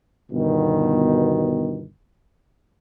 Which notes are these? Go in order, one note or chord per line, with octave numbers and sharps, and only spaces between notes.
G1 B2 D#3